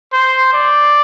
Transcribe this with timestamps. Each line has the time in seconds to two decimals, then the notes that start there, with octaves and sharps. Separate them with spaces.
0.13 C5
0.53 D5